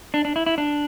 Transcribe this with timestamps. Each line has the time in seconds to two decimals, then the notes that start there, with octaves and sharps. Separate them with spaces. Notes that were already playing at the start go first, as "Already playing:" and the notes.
0.14 D4
0.25 D4
0.36 E4
0.46 E4
0.58 D4